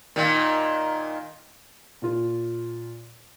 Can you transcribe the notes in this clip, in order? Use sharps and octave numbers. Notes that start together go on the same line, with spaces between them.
A#2 D#3
A#2 F4